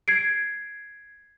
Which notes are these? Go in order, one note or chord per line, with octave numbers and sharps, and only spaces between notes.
G#6 C7 D7